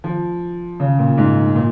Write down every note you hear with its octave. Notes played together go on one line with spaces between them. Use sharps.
F3
C#3
A#2
G#2
A#2